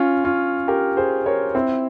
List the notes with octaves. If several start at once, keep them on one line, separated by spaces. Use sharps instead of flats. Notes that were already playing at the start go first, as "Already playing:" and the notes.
Already playing: C#4 F4
C#4 F4
G4 A#4
G#4 C5
A#4 C#5
C4 E4